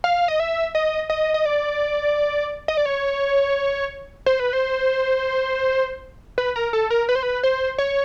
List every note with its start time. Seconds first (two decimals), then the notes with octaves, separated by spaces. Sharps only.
0.04 F5
0.28 D#5
0.40 E5
0.75 D#5
1.10 D#5
1.34 D#5
1.45 D5
2.68 D#5
2.77 D5
2.86 C#5
4.26 C5
4.40 B4
4.53 C5
6.38 B4
6.56 A#4
6.73 A4
6.90 A#4
7.09 B4
7.15 C5
7.23 B4
7.43 C5
7.78 C#5